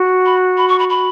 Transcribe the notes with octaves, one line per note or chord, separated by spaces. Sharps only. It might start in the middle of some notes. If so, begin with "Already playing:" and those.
Already playing: F#4
B5
B5
C#6
B5
B5